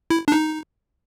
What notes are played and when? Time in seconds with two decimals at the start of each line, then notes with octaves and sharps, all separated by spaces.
0.10 E4
0.28 D4
0.32 D#4